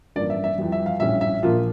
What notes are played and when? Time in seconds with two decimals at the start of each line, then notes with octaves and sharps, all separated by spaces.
0.16 A1 G2 F3 A#3 D5
0.30 E5
0.44 E5
0.58 F2 E3 G3
0.72 E5
0.86 F5
1.00 A#1 A2 G3 C#4 E5
1.21 E5
1.43 A#1 A#2 F3 A#3 F4